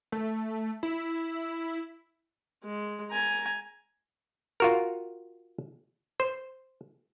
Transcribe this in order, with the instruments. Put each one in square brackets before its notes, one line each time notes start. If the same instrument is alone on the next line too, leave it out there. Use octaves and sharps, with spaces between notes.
[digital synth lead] A3
E4
[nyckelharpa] G#3
G#5 A#5
[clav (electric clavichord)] F4 F#4 A#4
C5